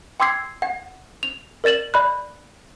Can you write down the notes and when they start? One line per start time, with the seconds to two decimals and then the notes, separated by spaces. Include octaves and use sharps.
0.20 G5 C6 D6 E6 G#6 C7
0.62 F#5
1.23 F7
1.64 A#4 D5 A6 E7 F#7
1.94 D5 B5 F#6